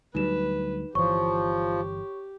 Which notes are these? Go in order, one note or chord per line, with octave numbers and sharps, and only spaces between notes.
D2 F#3 G3 D#4 B4 E7
G1 E3 F3 G4 C#5 C#6